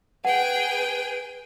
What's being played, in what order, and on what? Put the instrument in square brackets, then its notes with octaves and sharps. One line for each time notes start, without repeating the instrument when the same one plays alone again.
[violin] G#4 G5 [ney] B4 [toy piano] F#5